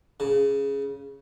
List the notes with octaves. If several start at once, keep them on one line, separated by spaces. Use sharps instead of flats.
C#3